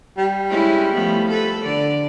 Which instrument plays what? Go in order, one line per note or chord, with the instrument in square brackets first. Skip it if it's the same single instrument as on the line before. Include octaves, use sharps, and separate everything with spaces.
[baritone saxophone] G3
[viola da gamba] G#3 C#4 E4
F3 A3 B3
A4 B4
D3 D5